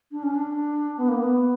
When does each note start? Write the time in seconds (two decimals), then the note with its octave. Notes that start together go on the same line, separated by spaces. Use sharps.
0.12 D4
0.23 C#4
0.35 D4
0.98 B3
1.08 A#3
1.20 B3